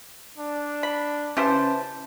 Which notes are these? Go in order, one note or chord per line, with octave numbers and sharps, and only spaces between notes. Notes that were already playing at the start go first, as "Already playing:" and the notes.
D4
B5
C#3 E3 G4 C5 A5